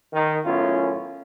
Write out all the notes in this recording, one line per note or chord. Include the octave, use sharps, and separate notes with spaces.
D#3
F#2 A2 B3 C#4 F4